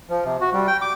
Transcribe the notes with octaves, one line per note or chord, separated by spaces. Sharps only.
F3
C3
F#4
G3
G5
D6